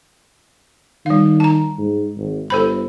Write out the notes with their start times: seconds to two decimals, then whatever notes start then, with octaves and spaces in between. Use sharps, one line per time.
1.06 D#3 G3 F5
1.40 A5 A#5
1.78 G#2
2.17 G#1
2.50 G1 A4 C5 B5